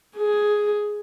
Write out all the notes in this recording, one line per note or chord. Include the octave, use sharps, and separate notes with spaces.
G#4